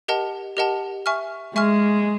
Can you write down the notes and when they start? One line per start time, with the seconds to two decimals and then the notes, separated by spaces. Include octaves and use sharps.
0.08 G4 A#4 D#5 F#5 A5
0.57 G4 A#4 D#5 F#5 A5
1.06 E5 G#5 C#6 F6
1.55 G#3 E5 G#5 C#6 F6